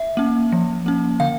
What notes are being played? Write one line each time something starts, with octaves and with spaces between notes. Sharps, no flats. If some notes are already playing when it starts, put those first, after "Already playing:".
Already playing: E5
A#3 C#4
F3
A#3 C#4
D3 F5